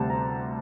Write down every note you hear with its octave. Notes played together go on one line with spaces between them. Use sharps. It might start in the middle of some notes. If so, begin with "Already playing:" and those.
Already playing: D2 C3 G3 A5
A#5